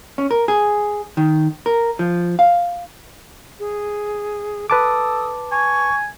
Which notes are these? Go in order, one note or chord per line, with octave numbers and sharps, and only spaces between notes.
C#4
A#4
G#4
D#3
A#4
F3
F5
G#4
A4 B4 A5 D6 D#6
G#5 C#6